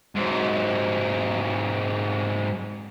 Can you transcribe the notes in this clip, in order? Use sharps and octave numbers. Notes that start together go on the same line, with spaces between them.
G#2 F#3